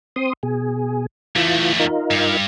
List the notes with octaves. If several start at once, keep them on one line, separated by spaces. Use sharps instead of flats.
C4 C6 D#6
B2 G#4
E2 E3 A3 F4
D#4 F4 A#4
G2